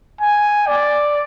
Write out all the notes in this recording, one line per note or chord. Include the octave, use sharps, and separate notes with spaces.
G#5
D5